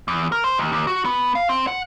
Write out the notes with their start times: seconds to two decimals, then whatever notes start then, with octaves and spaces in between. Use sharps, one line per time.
0.08 E2
0.32 A#4
0.44 C5
0.58 D#2
0.72 D#2
0.87 F#4
1.05 B3
1.35 F5
1.49 C4
1.67 F#5